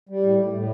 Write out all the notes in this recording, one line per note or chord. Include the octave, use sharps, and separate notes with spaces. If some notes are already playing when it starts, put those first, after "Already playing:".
G3
A2
A2
A2